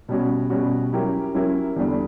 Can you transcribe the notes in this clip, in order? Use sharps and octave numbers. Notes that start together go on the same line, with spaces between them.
B2 G3 C#4 F#4
B2 G3 C#4 F#4
F#3 C#4 E4 G4 A#4
F#3 C#4 E4 G4 A#4
E2 D3 G3